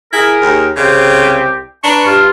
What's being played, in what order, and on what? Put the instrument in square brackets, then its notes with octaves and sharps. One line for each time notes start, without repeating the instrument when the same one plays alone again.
[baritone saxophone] E4 [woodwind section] G#4 A#4
[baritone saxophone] D#2
[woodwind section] C2 C4 G4 [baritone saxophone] C#3
[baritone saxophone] D4 [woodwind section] B4 A#5 C#6
[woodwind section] G2 F4